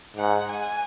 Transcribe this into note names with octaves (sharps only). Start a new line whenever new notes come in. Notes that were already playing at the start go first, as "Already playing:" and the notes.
G#2 F#5
G#5